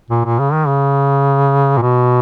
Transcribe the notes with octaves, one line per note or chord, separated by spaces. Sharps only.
A#2
A#2
C#3
D#3
C#3
A#2
B2